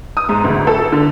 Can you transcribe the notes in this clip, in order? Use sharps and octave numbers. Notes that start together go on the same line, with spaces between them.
D#6
G#2
D2
A4
D3